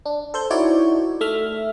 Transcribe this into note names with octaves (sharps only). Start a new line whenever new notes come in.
D4
A4 C5 G6
D#4 E4 F#4 C#5 D5
A3 E5 F6